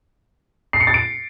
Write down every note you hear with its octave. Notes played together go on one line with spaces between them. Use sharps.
C7
C#7
A6
D7